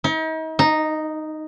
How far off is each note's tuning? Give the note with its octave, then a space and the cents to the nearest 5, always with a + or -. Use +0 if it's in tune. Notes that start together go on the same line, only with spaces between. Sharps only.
D#4 +40
D#4 -5